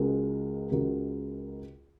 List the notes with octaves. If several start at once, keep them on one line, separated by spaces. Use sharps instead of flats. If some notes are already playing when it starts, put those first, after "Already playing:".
Already playing: C#2 C#3 G#3 F#4 A#4
C#2 C#3 G#3 F#4 A#4